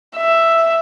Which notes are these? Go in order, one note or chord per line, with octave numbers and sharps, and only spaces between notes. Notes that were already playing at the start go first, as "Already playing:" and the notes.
E5